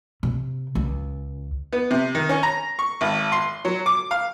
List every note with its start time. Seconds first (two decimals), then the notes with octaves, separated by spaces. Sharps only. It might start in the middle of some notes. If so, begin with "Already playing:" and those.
0.23 C3
0.75 C#2
1.73 B3
1.91 C3
2.15 D#3
2.29 C#4
2.43 A#5
2.79 C#6
3.01 G#1
3.32 C6
3.65 F#3
3.86 D6
4.11 F5